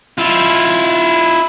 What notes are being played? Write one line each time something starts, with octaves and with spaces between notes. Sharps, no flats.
E4 F4